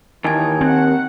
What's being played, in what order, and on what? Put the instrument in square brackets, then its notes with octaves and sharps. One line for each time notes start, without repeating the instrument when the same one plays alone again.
[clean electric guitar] D#2 [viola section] E3 A#3 D#4 [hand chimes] G#5 A5 G#6
[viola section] D#3 F#5 [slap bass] C4